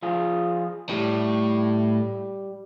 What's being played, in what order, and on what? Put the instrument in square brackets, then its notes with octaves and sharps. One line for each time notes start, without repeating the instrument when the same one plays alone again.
[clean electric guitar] F3 F4 G#4
[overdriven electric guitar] A2 [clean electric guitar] G3